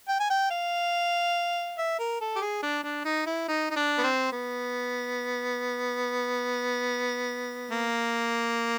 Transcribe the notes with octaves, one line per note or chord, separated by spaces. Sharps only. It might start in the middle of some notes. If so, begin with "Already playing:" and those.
G5
G#5
G5
F5
E5
A#4
A4
G4
G#4
D4
D4
D#4
E4
D#4
D#4
D4
B3
C4
B3
A#3